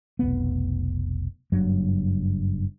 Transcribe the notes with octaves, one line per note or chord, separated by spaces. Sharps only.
F1 B1 B3
F#1 G2 F#3